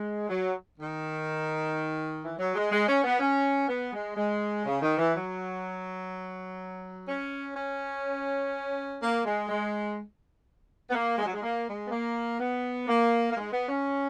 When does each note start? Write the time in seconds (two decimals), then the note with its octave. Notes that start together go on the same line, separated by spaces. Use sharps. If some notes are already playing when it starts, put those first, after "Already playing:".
Already playing: G#3
0.29 F#3
0.79 D#3
2.24 E3
2.39 F#3
2.55 G#3
2.72 G#3
2.88 C#4
3.04 B3
3.20 C#4
3.68 B3
3.93 G#3
4.17 G#3
4.65 C#3
4.82 D#3
4.98 E3
5.13 F#3
7.08 C#4
7.56 C#4
9.00 A#3
9.25 G#3
9.49 G#3
10.90 B3
10.95 A#3
11.18 G#3
11.26 F#3
11.33 G#3
11.43 A#3
11.67 G#3
11.87 B3
11.91 A#3
12.40 B3
12.88 A#3
13.31 A#3
13.37 G#3
13.52 B3
13.69 C#4